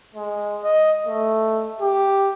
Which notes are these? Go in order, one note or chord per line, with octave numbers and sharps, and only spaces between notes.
G#3
D#5
A3
G4